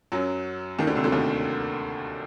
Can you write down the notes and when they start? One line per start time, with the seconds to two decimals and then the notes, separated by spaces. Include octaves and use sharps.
0.12 F#2 F#3
0.79 D#2 D#3
0.87 D2 D3
0.95 C2 C3
1.04 D2 D3
1.12 D#2 D#3